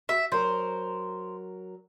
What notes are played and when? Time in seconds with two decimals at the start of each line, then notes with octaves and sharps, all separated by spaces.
0.09 F#4 E5
0.32 F#3 A#4 C5